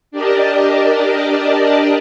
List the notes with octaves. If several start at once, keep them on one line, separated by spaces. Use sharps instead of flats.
D4 G4 A#4 D5 D#5 A5